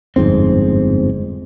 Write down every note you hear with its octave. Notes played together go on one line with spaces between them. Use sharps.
G1 F2 G#2 C4